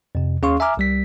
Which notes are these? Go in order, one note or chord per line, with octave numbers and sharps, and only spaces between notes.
F2 C3
D#2 C#4 G#4 F5 C6 C#6
E5 G#5 A#5 D6 F6
C2 G3 B6